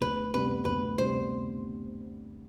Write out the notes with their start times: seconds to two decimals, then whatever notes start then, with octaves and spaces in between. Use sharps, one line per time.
0.01 D2 B4
0.34 C3 G3 B3 B4
0.65 D2 B4
0.97 C3 G3 B3 C5